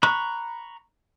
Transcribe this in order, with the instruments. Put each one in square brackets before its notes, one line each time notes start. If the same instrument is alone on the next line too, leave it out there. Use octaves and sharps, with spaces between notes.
[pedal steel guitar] A#5 B5 C#6 F#6